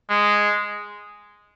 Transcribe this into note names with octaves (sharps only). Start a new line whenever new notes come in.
G#3